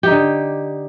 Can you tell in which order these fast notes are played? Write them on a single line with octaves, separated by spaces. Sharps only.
G4 D#4 D3